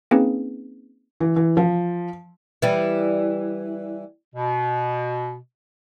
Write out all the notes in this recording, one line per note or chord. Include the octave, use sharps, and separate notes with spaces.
A#3 C4 C#4 D#4 G#4 B4
E3
E3
F3
E3 G3
B2